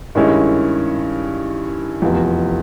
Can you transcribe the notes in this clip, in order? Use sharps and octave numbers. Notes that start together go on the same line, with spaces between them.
G2 D#3 G#3 C#4 E4
F1 E2 C3 F3